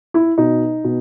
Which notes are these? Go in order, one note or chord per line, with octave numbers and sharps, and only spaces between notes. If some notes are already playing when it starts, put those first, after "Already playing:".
E4
B2 D#4
B2